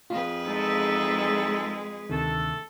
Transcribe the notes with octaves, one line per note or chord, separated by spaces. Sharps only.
F2 F4 G#4 B4
E2 G#3 D#4 A4
D2 C3 D#3 A3 D4 A4